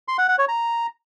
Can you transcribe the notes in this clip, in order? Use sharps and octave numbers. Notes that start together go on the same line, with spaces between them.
C6
F#5
F#5
C#5
A#5